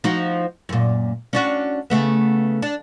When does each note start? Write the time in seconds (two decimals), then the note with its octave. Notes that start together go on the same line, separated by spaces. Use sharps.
0.04 F3 D#4 F#4
0.69 F#2 A#2
1.33 C#4 D4 F#4
1.90 C#3 A3 B3
2.62 D4